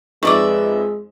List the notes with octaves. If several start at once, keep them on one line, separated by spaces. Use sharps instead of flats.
F2 G#3 D#4 B4 D5 E5 C#6 D6